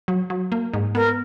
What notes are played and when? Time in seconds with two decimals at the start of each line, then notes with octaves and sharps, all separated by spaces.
0.08 F#3
0.30 F#3
0.52 A#3
0.73 G#2
0.95 B3 A#4